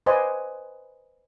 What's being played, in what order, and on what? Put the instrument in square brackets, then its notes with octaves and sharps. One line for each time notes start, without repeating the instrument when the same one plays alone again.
[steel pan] B4 C5 D5 D#5 F#5 G#5